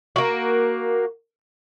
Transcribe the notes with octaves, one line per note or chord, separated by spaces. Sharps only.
A#3 F#4